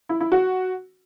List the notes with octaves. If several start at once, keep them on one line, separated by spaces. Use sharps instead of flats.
E4
E4
F#4